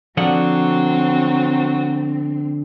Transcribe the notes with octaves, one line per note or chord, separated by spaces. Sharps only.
D3 F3 F#3 C4 F#5